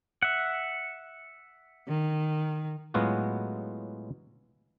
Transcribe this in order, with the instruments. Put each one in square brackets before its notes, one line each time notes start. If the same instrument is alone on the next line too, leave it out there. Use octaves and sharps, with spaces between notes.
[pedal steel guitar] E5 F#5
[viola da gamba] D#3
[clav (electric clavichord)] A2 F#3 G#3 B3 F4 F#4